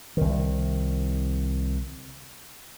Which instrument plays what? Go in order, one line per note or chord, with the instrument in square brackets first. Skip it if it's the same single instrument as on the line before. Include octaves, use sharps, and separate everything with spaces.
[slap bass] C2 D#3